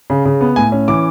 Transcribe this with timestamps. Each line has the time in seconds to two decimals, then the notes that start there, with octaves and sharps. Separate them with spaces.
0.10 C#3
0.25 C#3
0.41 B3
0.56 A2 G#5
0.72 C#4
0.88 E3 D6